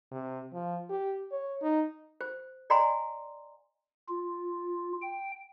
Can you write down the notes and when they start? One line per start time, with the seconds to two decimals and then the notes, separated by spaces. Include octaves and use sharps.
0.12 C3
0.54 F3
0.90 G4
1.32 C#5
1.62 D#4
2.21 C5
2.70 D5 D#5 F#5 G#5 A#5 C6
4.09 F4
5.02 G5